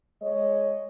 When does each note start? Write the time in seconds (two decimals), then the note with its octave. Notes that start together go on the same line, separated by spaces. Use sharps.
0.22 G#3 C#5 D#5